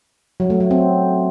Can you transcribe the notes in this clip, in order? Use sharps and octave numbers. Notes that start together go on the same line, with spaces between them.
F#3
A3
F#3
C4